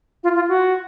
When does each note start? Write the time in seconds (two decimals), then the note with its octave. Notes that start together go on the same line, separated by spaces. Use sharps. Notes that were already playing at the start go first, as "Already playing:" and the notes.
0.23 F4
0.35 F4
0.49 F#4